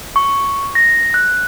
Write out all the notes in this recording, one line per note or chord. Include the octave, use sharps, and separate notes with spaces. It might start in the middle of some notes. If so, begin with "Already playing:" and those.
C#6
A#6
F#6